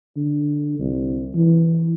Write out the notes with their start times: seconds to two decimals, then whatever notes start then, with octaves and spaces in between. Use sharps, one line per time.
0.17 D3
0.79 C2
1.35 E3